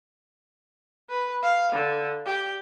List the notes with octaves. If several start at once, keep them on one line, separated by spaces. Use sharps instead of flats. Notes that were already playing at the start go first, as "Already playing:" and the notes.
B4
F5
D3
G4